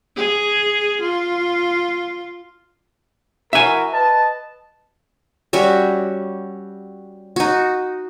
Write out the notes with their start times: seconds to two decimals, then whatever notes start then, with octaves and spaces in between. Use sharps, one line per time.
0.16 G#4
1.01 F4
3.53 E4 F#4 A#4 E5 G#5
3.93 B4 D#5 A5
5.53 G3 C#4 F#4 E5
7.36 D#4 F#4